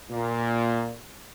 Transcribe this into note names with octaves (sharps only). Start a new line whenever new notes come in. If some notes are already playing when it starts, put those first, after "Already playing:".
A#2